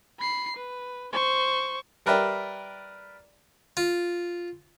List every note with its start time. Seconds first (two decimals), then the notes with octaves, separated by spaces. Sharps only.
0.19 B5 C7
0.56 B4
1.13 C5 C#6
2.06 G3 A#4 B4 D5 E5 G5
3.77 F4